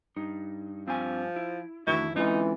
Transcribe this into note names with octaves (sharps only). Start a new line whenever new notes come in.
G2 D#4
F3 C4 D4 G#5
E4
F2 D#3 E3 A3 D4 E4 F#4
D3 E3 G#3 C4 C#4 D#4 F4